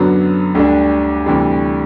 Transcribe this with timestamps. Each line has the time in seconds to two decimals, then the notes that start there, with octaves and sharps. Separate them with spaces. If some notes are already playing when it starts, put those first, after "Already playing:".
Already playing: F#2 D3 F#3 B3
0.55 D2 D3 G3 D4
1.26 D2 C3 E3 G3